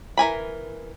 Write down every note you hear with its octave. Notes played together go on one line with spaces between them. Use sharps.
E3 A#4 G#5 B5